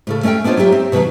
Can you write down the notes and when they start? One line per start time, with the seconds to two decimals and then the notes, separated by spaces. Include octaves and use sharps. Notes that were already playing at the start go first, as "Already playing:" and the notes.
0.07 A2 C#3 A4
0.23 A3 C#4 C#5 F5 G5
0.44 B3 D4 D#4 F4 C5 C#5
0.57 F#3 D#4 G4 E5
0.72 C4
0.92 B2 D#3 F#3 B4 F5